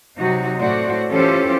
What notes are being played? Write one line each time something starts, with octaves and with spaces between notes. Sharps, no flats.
C3 F#3 D#4 F#4
A2 A3 F#4 C5 D5
E3 C#4 F4 G4 A4 C5